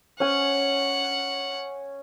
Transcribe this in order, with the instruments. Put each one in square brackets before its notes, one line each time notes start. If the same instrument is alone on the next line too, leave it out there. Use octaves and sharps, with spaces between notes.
[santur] C#4 G#5 [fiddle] F#5